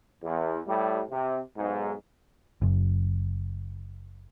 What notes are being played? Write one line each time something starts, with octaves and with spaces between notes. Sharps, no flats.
E2
A2 G3
C3
B1 G#2
F#1 F#2